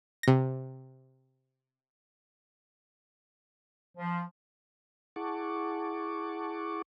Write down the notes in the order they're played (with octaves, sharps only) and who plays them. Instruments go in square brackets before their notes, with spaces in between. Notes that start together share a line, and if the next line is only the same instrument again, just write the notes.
[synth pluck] C3 A#6
[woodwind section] F3
[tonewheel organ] E4 G#4 F#5 A5 C#6 D6